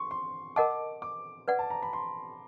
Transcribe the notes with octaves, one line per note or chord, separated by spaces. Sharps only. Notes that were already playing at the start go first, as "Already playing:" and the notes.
Already playing: C6 C#6
C6
A#4 D#5 F#5 A5 D6
D6
B4 D5 F#5
A5
A#5
B5
C6